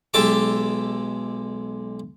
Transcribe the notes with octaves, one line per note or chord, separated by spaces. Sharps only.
B1 G#3 G4 E5 A5 D6